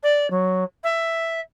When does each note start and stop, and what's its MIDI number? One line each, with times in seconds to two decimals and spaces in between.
0.03 0.30 74
0.30 0.64 54
0.84 1.40 76